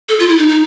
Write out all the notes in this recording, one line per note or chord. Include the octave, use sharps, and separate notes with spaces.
A4
F4
E4
D#4
D#4